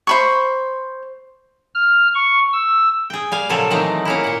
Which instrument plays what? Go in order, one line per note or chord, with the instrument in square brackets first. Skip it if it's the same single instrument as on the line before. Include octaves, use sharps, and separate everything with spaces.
[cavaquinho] C5 B5 C#6
[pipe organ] F6
C#6
E6
[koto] G#4 G5
G3 F5 G#5
A#2 C#3 F3 F#3 A4 G#5
D#3 E3 F#3 G#3 A3 C4
A#3 C#4 E4
A#2 F#5